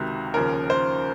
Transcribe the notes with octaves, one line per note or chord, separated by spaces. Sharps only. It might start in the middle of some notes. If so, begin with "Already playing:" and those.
Already playing: C#2 C3 D#3 F#4
D#2 C#3 F3 A#4
C5